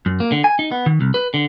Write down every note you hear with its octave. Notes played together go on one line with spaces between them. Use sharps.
F#2
A#3
D3
G#5
D#4
B3
D#3
C2
B4
D3